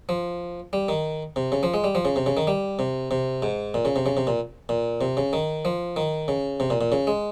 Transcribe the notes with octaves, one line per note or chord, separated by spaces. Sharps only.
F3
G3
D#3
C3
C#3
F3
G#3
G3
F3
C#3
C3
C#3
D#3
G3
C3
C3
G#2
A#2
C#3
C3
C#3
C3
A#2
A#2
C3
C#3
D#3
F3
D#3
C#3
C3
A#2
A#2
C#3
G#3